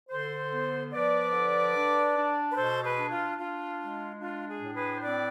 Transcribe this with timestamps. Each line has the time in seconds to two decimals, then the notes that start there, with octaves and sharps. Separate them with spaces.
0.10 D3 A4 C5
0.51 B3
0.92 F3 B4 D5
1.33 D3
1.75 D4
2.15 D4
2.51 B4
2.56 B2 A4 C5
2.84 G#4 B4
2.97 D4
3.11 F4
3.38 D4 F4
3.79 G#3
4.20 D4 F4
4.48 G#4
4.61 A2
4.75 G#4 B4
4.98 C5
5.02 C4 B4 D5